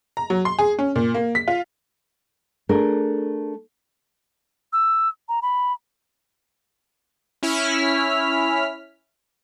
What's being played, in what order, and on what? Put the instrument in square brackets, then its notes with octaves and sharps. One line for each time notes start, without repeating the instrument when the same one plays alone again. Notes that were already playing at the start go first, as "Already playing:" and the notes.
[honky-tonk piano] A#5
F#3
C6
G#4
C#4
A#2
A#3
B6
F4
[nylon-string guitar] A3 D4 G#4 A#4
[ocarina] E6
A#5
B5
[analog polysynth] C#4 E4 F6 B6